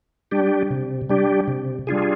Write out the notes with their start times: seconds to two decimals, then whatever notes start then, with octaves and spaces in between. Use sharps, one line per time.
0.31 G3 D4 G4
0.70 C3
1.10 G3 D4 G4
1.48 C3
1.87 G3 D4 F4 G#4